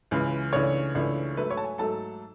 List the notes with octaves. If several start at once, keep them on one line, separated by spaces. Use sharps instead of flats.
C#2 C#3 E3 G#3
C#2 C#3 E3 A3 D4 C#5 C#6
C#2 C#3 E3 A3 D4
G#2 F#3 A3 B4 B5
C#5 C#6
A5
G#5
G#2 F#3 A3 A4 A5